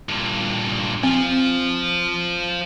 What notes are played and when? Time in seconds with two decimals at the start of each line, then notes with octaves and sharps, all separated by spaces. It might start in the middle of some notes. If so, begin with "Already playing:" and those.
0.09 G2 A#2
1.04 F3 C4